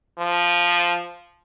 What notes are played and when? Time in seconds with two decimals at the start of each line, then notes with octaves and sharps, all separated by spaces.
0.18 F3